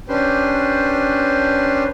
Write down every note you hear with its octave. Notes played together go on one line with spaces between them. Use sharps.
C#4 D4 G4 B4 C5